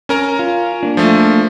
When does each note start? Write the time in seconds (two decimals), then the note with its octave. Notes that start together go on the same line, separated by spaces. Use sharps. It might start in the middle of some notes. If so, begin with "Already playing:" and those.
0.09 C#4 A#4 A#5
0.39 F4
0.83 A#3 D4
0.97 F3 A3